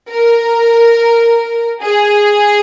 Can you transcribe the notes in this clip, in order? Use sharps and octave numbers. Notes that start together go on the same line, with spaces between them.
A#4
G#4